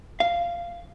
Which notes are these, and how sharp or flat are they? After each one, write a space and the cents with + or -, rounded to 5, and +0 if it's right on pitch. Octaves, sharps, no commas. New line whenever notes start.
F5 -10